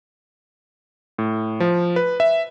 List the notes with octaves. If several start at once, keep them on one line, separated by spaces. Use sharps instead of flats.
A2
F3
B4
E5